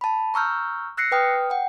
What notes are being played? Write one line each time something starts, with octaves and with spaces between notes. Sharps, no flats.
A5 B5
A#5 C#6 E6 F6 G6
E6 F#6 A#6 C7 C#7
B4 G5 D#6 F6
F#5 G5